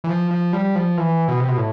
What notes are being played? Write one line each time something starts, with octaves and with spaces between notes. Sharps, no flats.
E3
F3
F3
G3
F3
E3
B2
C3
B2
A2